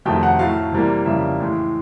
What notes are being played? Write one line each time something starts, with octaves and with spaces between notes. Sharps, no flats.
F2 C3 D#3 F#3 A3 G5
F#5
A2 F#3 A3 F5
C3 E3 G3 A#3
F2 C#3 E3 G3 A#3 E5
A2 E3 G#3